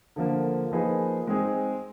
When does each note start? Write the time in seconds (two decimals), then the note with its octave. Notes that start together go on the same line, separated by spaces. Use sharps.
0.16 D3 F3 A#3
0.72 F3 A#3 D#4 G#4 B4
1.27 G#3 C4 D#4 G#4